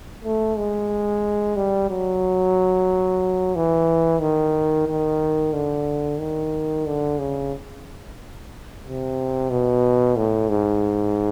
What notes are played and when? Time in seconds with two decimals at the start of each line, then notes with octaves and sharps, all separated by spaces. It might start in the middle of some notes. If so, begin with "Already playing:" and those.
0.24 A3
0.57 G#3
1.56 G3
1.90 F#3
3.55 E3
4.21 D#3
4.87 D#3
5.53 D3
6.19 D#3
6.86 D3
7.19 C#3
8.84 C3
9.50 B2
10.16 A2
10.49 G#2